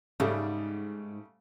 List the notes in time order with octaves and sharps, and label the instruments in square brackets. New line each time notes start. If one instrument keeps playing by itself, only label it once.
[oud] G#2 [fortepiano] C#3 G3 A3